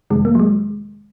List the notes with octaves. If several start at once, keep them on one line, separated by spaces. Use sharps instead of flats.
F2 C3 D#3 G#3
A#3
F#3
G#3